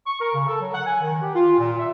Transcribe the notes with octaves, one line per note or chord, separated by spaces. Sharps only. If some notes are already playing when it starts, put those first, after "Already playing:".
C#6
A#4
C#3
A4
F#3
F#5
G#5
D#3
G4
F4
A#2
E5